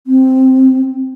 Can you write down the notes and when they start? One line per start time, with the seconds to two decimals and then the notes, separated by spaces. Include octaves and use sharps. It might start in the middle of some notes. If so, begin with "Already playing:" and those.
0.07 C4